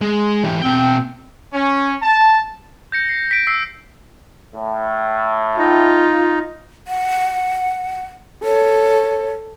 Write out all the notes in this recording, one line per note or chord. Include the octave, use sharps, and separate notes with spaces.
G#3
E3 G4
B2 C4 G5
C#4
A5
G6 A#6 C#7
C7
B6 D7
E6 B6 C7
A2
D#4 F4
F#5
A4 C#5